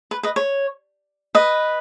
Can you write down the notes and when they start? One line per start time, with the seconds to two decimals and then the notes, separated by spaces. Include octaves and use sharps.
0.11 B4
0.23 B4 D#5
0.36 C#5
1.35 B4 D#5